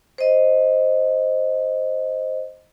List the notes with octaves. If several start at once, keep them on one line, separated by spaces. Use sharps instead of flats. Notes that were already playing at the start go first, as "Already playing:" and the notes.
C5 D#5